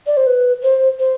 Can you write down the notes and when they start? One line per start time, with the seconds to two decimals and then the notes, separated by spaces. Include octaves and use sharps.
0.07 D5
0.17 C5
0.27 B4
0.63 C5
0.99 C5